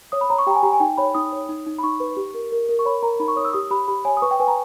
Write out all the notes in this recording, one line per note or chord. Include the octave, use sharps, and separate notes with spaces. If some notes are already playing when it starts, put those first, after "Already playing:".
C#5 D#6
B5
C#5 A#5
C#6
G4 G5 A#5
G#5
G4 A#5
G#5
D#4 G5
C#5 B5
D#4 D#6
C#5
D#4
D#4
B5
D#4 C#6
B4
G4
A#4
A#4
A#4
C#6
C#5 B5
A#4 A#5
D#4 B5
C#6
C#5 D#6
E6
G4 D#6
G4 B5
G4 B5
C#5 G#5
D#6
B4 C#6
G5
B4 G#5
A#5